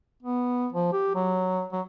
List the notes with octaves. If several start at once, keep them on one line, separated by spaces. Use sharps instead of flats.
B3
F3
G4
F#3
F#3